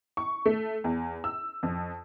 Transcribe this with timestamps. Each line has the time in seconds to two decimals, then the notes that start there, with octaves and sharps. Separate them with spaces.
0.17 C#6
0.46 A3
0.84 E2
1.24 E6
1.63 F2